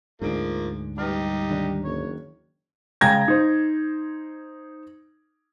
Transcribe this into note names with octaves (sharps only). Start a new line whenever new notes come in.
D2 G#2 F3 G#3 A#3 D4 D7
G3 D#4 G4 B4 F6
D#3 D4 A#5
F#1 C#5
C#3 G#3 G5 A#5 G#6 A#6
D#4 C5